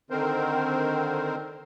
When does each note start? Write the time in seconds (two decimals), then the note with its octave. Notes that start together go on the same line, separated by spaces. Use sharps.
0.10 D3 D#3 C4 A#4 C5